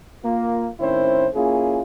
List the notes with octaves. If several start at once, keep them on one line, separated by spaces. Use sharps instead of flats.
A#3 F4
A2 D#3 C4 C#4 E4 C5
A#3 C#4 E4 F4 G#4